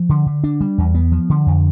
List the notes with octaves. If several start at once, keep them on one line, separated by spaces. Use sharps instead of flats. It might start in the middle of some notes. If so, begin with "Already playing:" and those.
Already playing: F3
D3
D3
D4
G3
E2
B3
F3
D3
F2